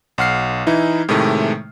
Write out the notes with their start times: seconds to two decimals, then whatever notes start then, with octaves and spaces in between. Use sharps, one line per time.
0.18 B1 F#5 F6 C7
0.67 E3 D#4 E4
1.09 A2 C3 D#3 G#3 A3